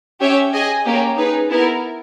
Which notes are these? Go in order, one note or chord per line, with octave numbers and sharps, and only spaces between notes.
C#4 G4 C#5 E5
G#4 D#5 G#5
A#3 C#4 G4
D#4 G#4 B4
B3 E4 A#4